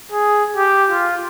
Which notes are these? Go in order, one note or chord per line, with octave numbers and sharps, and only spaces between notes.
G#4
G4
F4